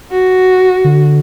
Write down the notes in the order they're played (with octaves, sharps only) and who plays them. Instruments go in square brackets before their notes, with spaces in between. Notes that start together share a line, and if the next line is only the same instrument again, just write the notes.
[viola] F#4
[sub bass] D3